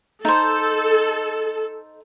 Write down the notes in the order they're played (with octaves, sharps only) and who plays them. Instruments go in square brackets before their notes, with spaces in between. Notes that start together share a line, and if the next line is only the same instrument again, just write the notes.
[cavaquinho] D#4 C5 [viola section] A4